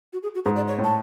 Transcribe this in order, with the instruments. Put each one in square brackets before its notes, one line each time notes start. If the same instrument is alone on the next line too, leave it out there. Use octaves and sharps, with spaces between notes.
[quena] F#4
G#4
F#4
[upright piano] G#2 [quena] G#4
[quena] D5
C#5
[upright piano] A2
[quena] A5